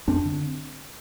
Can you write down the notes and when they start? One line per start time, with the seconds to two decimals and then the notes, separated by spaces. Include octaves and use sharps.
0.08 F2 C4 D4
0.25 D3